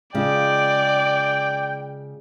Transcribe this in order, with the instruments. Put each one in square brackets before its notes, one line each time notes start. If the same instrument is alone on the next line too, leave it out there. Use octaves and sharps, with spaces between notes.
[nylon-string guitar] C#3 [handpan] G#3 F4 [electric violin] D5 [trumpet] G5